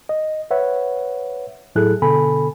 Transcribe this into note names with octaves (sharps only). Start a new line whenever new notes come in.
D#5
B4 C#5 E5 F#5
A2 F#3 E4 G#4 A4 F#6
B2 D3 B3 A4 G#5 B5